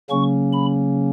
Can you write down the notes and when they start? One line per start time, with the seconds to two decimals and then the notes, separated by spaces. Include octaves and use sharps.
0.10 C#3 F#3 A#3 C#4 C#6
0.53 B5